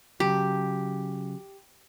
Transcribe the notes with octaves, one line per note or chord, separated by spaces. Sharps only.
C#3 F#3 G4